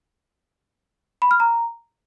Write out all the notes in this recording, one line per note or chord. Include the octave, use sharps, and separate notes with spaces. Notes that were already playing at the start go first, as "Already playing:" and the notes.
B5
F6
A#5